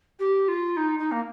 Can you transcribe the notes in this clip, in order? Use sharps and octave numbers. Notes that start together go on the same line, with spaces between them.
G4
F4
D#4
D#4
A#3